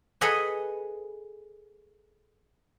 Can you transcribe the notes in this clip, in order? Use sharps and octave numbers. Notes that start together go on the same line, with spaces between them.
G#4 A4 B4 D#5 F#5 G#5